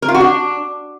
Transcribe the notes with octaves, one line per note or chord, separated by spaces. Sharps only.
A#4
F4
F#4
D4